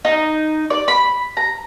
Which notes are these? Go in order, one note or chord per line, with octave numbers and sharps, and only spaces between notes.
D#4
D5
B5
A#5